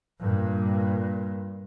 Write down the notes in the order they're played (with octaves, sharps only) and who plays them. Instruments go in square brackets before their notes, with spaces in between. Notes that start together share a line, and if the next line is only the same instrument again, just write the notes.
[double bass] G2 A#2